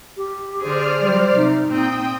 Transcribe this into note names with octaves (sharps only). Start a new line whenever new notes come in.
G4
D3 G#4 C5 D5 F6
F#3 G3
C3 D#4
A#2 C4 G5 D#6